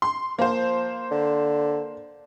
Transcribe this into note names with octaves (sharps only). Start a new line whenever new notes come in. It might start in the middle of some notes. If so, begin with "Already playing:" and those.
C6
F3 A#3 C5
D3